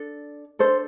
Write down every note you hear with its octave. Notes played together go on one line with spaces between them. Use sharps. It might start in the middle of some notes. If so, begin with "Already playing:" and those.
Already playing: D4 A4
D4 A4 C5